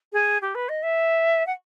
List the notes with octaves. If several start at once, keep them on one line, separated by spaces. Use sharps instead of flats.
G#4
G4
B4
D#5
E5
F#5